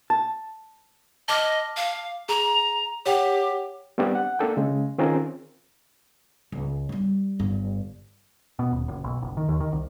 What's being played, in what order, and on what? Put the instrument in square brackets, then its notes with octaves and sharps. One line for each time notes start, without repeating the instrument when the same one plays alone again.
[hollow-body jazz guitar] A5
[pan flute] D#5 [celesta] A5 D6 F6
[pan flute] F5
[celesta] G#4 [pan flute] A#5
[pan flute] G4 [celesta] C#5 F#5 G5
[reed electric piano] G3 B3 C4 D4 G4
F#5
A#3 D4 A4 G5
C#3 G#3
D#3 C4 C#4 F4 G#4 A#4
[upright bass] C#2
F#3 G3
G1 G2
[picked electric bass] B2
D#1
F#1
B1
F#1
D#3
D#2
D#3
C2